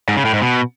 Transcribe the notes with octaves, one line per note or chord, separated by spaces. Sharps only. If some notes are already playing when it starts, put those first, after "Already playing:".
G#2
C#3
A2
G#2
B2